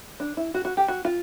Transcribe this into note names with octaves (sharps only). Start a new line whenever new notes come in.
D4
E4
F#4
F#4
G4
F#4
F4